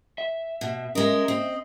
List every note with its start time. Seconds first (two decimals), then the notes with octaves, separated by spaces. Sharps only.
0.18 E5
0.61 B2
0.95 G#3 C#4 A#4 D#5
1.28 C4